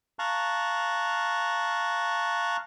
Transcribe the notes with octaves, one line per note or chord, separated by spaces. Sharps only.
F5 A5 A#5 C#6 F#6